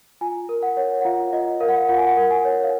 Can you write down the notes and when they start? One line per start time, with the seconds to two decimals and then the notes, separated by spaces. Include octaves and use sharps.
0.21 F4 G#5
0.49 A#4
0.63 F#5
0.77 C#5
1.01 F#5
1.05 F4 F5
1.33 F4 D#5
1.61 A#4 F5
1.69 F#5
1.76 F5
1.89 F4 F#5
1.98 G#5
2.07 F#5
2.17 A#4
2.31 G#5
2.45 C#5
2.64 F5